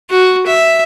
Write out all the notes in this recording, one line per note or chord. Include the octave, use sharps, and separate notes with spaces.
F#4
E5